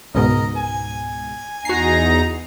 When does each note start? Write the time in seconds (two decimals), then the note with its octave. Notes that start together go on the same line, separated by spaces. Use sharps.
0.15 C#2 G#2 B2 A#4 D#5
0.57 G#5
1.65 E2 D#4 F#4 A#5 C7